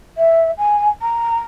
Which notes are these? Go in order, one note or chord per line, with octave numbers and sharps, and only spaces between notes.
E5
G#5
A#5